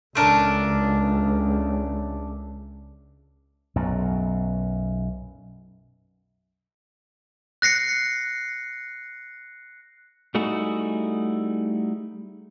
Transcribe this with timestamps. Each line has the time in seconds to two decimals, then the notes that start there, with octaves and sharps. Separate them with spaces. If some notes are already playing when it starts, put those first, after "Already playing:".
0.15 C#2 A3 D4 A#4
3.76 B1 F#2
7.62 F#6 A#6 C7 C#7
10.35 G3 A3 D#4 E4 F#4 G#4